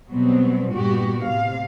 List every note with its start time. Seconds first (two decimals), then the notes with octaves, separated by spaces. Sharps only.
0.11 B2 F#3 G3 B3 C4
0.74 G2 A#2 B3 F#4 G4
1.23 A2 C3 F5